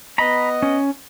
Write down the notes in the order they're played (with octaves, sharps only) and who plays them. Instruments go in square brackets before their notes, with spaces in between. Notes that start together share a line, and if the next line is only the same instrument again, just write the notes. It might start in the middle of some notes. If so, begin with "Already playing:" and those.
[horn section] B3 D#5 [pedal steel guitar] A#5 B5
[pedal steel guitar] C#4